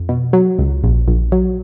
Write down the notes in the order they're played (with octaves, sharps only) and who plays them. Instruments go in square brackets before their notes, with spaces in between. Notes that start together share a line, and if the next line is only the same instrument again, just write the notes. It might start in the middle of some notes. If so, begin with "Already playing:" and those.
Already playing: [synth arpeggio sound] F2
B2
F#3
C#2
A#1
A#1
F#3